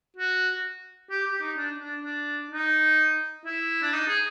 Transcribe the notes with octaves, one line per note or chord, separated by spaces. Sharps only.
F#4
G4
G4
D#4
D4
D4
D4
D#4
E4
D4
D#4
G#4